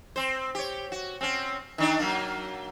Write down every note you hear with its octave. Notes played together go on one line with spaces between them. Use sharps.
C4 C5
G4 C#5
F#4
C4 C#4
D#3 D4 D#4
F#3 A#3 D4